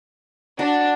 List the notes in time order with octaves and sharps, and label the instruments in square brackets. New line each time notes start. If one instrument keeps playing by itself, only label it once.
[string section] D4 [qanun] F#4